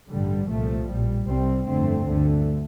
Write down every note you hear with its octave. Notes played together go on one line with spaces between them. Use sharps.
A1 G2 D3 G3
C2 A#2 F3 A3
A#1 A2 G3
C2 C3 G3 C4
G1 F2 D3 A3 C4
D2 D3 A3